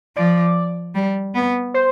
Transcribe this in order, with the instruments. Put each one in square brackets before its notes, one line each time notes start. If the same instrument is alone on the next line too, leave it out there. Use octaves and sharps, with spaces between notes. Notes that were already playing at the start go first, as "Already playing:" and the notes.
[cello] F3 [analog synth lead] D5
[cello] G3
B3
[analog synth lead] C5